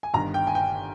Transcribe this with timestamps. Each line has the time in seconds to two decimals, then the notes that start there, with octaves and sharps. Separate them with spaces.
0.03 G#5
0.13 G1 G2 D#3 A#5
0.34 G5
0.47 G#5
0.55 G5